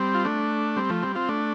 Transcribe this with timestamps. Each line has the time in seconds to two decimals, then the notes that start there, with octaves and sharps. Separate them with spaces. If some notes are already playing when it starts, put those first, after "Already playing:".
Already playing: G3 C4
0.14 F4
0.24 A3 D4
0.76 G3 C4
0.90 F3 A3
1.02 G3 C4
1.15 C4 F4
1.29 A3 D4